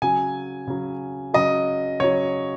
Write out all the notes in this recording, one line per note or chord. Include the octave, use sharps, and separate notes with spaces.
C#3 F#3 G#5
C#3 F#3
C#3 F#3 D#5
C#3 F#3 C#5